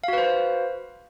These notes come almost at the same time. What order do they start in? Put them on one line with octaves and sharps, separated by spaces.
F5 F#4 B4 C5